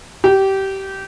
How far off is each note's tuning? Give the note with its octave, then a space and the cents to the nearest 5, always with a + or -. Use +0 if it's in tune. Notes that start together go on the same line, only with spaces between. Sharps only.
G4 -20